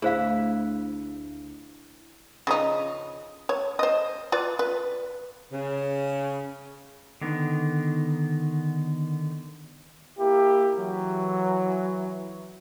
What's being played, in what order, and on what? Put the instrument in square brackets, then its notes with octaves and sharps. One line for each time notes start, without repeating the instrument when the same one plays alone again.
[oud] D2 E5 [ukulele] E4 [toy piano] G#4 C5 F5
[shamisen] C#3 F3 D#4
C#5
C5 D#5
F4 B4 D5
B4
[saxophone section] C#3
[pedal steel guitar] D3 D#3 B3
[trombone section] A#3 E4 G4
E3 F#3